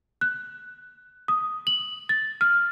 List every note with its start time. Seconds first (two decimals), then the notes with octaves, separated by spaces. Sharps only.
0.21 F#6
1.28 D#6
1.67 F#7
2.09 A6
2.41 F6